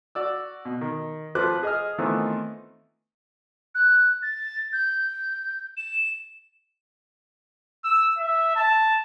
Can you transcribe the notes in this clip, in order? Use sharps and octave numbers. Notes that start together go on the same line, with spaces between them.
F#4 D5 E6
B2
D#3
F2 F3 B4 C5 D6 F#6
G#4 D#5 D#6 F6
D#3 E3 A3 B3 C4 F4
F#6
A6
G6
E7
E6
E5
A5